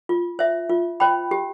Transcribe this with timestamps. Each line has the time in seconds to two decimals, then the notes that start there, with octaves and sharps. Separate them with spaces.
0.09 F4
0.39 C5 E5
0.69 F4
1.00 C5 G5 B5
1.31 G4